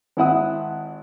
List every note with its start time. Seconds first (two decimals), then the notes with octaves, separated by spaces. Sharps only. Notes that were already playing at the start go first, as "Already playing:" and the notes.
0.17 G#1 E4 F#5 D#6